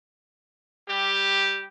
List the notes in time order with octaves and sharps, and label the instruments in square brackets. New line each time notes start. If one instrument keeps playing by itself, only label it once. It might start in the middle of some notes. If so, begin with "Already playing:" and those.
[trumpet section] G3 G4